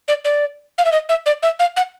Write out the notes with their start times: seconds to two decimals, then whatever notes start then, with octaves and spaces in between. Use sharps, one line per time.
0.08 D5
0.25 D5
0.78 F5
0.85 E5
0.92 D#5
1.09 E5
1.26 D5
1.43 E5
1.59 F5
1.77 F#5